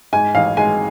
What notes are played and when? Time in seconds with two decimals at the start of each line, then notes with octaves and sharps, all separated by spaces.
0.13 G#2 G#5
0.35 A1 F5
0.57 G#3 G#5